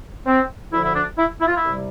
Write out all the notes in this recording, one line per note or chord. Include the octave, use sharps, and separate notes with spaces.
C4
D2 D3 F3 E4
E4
D4
E4
E4
F4
E4
C2 C3 G3